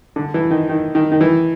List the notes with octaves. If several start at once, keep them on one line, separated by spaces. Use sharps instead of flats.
D3
E3
D#3
D#3
D#3
D#3
E3